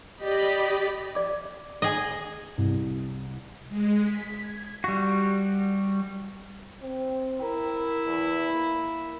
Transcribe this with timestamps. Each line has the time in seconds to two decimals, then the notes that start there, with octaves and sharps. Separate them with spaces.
0.22 G4 D5 D#5 B5
1.15 D5 D6
1.82 G#4 D#5
2.58 C2
3.69 G#3
4.03 B6
4.39 G#6
4.84 G3 F#4
6.82 C4
7.42 E4 A#4
8.06 E2
8.54 A#3